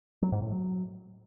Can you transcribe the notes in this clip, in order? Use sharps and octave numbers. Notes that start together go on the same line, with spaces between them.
F#3
G#2
A2
F#3